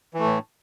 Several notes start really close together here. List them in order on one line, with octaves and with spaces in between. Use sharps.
E3 A3 A2